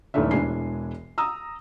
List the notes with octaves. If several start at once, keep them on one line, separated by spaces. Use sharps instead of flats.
D#1 D#3 E3 A3 D4 E5
E1 E3 G#3 D4 G#5 C7
A#5 D#6 E6